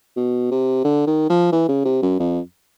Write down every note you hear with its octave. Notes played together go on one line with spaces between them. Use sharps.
B2
C3
D3
D#3
F3
E3
C#3
C3
F#2
F2